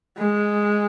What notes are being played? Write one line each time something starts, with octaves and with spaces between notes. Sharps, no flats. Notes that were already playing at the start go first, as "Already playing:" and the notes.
G#3